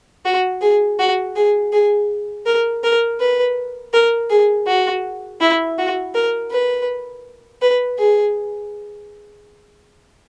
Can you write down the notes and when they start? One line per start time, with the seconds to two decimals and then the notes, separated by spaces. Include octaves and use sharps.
0.25 F#4
0.62 G#4
0.99 F#4
1.36 G#4
1.73 G#4
2.46 A#4
2.84 A#4
3.20 B4
3.93 A#4
4.30 G#4
4.67 F#4
5.41 E4
5.78 F#4
6.14 A#4
6.51 B4
7.62 B4
7.99 G#4